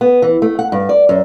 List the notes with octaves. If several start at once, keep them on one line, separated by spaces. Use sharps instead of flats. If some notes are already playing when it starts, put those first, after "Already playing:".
B3
E3
A3
F#5
G2
D5
F#2